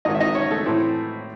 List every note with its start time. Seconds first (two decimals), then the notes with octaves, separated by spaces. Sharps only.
0.05 G#1 G#2 D#3 D#4 D#5
0.15 E5
0.20 D#4 D#5
0.35 C#4 C#5
0.51 A3 A4
0.66 A2 E3 C4